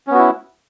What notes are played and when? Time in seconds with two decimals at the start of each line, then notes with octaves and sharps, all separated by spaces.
0.07 C#4
0.11 B3
0.15 F#4
0.18 E4